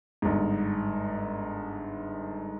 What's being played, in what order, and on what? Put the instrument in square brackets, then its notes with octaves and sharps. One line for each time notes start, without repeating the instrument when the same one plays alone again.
[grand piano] G1 G#2